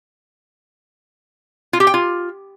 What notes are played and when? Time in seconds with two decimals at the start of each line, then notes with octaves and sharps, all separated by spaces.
1.73 F4
1.80 G4
1.87 G5
1.94 F4